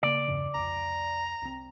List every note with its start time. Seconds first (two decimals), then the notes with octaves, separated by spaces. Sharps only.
0.03 C#3 A#3 D5
0.28 E2 G2 C#3
0.54 C2 F2 A#5
1.42 C2 C4